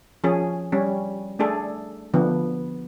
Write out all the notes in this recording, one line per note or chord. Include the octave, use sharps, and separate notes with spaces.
F3 C#4 G#4
G3 C#4
A3 D4 G#4 A4
D3 F3 B3